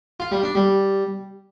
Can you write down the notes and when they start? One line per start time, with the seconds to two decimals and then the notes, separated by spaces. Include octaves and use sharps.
0.20 F4
0.32 G3
0.43 D4
0.55 G3